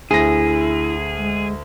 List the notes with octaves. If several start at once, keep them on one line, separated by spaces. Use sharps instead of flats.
D2 E4 G#4 A#6
G#3